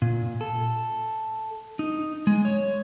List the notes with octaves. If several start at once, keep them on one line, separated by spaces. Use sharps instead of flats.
A#2
A4
D#4
G#3
C#5